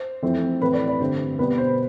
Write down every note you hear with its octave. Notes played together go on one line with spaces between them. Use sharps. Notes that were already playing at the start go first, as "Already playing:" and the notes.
Already playing: C5
F2 E3 A3 C4
A2 E3 A3 C4 B4
D5
D5
G2 D3 A3 C4 C5
B2 G3 B3 B4
C5